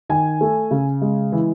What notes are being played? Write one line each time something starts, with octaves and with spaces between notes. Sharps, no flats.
D#3 G#5
A3
C#3
G#3
E3